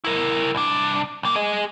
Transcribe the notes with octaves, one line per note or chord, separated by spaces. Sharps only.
E4 A#4
C2 D4
C2 A#3
G#4 D#5